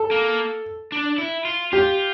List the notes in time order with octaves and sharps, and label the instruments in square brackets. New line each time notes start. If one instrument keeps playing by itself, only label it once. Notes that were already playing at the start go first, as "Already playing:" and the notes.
Already playing: [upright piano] A4
[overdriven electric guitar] A#3
D4
E4
F4
[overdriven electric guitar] F4 [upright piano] G4